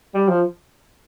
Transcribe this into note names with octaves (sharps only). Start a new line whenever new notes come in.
G3
F3